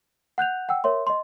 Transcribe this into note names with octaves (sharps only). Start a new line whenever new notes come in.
F#5 F#6 G6 F7
F#5 G5 E6
A#4 C#5 E5 C6
D#5 C6